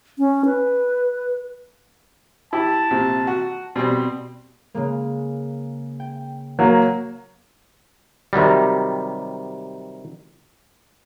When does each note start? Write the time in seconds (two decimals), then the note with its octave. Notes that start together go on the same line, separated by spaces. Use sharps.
0.19 C#4
0.45 B4
2.53 E4 G4 A5
2.91 A#1 C3
3.27 F#4
3.76 B2 G3 C4
4.74 C#3 G#3 A#3
6.00 G5
6.59 F#3 A#3
8.33 C3 D#3 F#3 G3